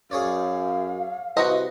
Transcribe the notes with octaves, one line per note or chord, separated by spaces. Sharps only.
F#2 G#4 C#5 D5 F5
C2 F#4 B4 C5 D#5